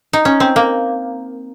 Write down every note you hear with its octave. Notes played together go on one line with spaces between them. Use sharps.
D#4
C#4
C4
A#3